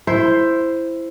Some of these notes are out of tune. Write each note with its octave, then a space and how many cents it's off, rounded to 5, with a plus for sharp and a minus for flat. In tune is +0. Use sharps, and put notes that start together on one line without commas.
E4 +10 C5 +0